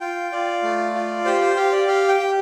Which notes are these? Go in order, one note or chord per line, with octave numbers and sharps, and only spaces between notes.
F4 G5
F4 D5
A3
F4
G4 C5
C5
G4 F5
D5
G4 F5
G5
G4